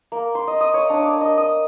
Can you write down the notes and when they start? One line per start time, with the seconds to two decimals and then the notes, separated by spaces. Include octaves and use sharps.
0.12 A#3
0.35 C6
0.47 D#5
0.61 D#6
0.74 C#5
0.90 D4
1.02 D6
1.21 D#5
1.37 D#6